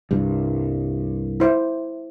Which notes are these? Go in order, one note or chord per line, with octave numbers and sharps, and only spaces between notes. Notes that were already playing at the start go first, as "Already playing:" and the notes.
C2 G2
E4 C5